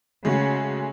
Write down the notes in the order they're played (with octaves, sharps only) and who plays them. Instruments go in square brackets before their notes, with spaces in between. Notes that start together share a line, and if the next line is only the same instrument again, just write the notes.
[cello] C#3 [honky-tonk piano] G#3 A3 F#4